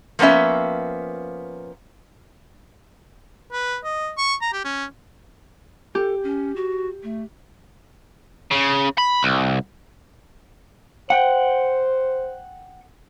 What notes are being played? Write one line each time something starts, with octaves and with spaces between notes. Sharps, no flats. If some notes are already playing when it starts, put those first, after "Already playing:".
F3 A#3 B3 C#4 E5
B4
D#5
C#6
A#5
G4
C#4
G4 A4
C#4
F#4
A3
C#3
B5
C2
C5 F#5 G5